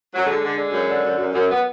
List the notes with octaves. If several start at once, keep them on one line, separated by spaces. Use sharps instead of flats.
F#3
D3 G#3
D3
D3
F#2
D3
F#2
F#2
F#2
B3